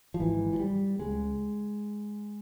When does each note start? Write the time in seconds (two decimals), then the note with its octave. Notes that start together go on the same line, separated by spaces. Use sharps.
0.14 F3
0.20 G#1 G#2 E3
0.53 F3
0.59 G3
0.99 C#2 C#3 G#3